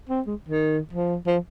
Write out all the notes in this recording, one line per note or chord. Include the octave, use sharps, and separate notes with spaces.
C4
G#3
D#3
F3
F3